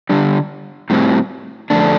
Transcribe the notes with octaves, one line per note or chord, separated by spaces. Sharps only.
D3 G3 D4
A2 G3 C4
F2 D3 A3 D4